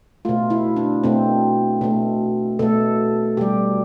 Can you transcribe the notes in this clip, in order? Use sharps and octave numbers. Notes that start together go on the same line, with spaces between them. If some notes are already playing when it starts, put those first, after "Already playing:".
B2 A3 F4
E4
D4
B2 A3 C4
B2 A3
B2 A3 A4
B2 G3 G4